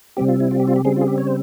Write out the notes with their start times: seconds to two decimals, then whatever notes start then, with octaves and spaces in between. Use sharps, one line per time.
0.17 C3 G3 C4 G4
0.28 F4
0.40 E4
0.51 F4
0.60 G4
0.68 F4
0.76 G4
0.85 C#3 G3 C4 G#4
0.96 F4
1.01 G#4
1.08 G4
1.18 C#5
1.27 C5